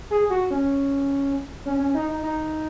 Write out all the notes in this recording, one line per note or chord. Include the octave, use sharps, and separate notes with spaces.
G#4
F#4
C#4
C#4
C#4
D#4
D#4
D#4